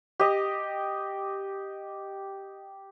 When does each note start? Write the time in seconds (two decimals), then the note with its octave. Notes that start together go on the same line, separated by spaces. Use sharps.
0.20 G4 D#5